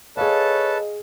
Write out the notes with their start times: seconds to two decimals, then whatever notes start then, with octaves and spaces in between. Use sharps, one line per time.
0.17 G#4 A4 B4 C#5 D#5 F5 A5